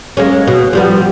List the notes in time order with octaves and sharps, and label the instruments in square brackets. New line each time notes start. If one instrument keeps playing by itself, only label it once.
[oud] G#3 A#3 C#4
B2
F3 G3 B3